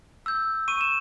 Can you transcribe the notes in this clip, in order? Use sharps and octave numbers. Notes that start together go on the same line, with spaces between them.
E6 G6
C#6 D#7
E7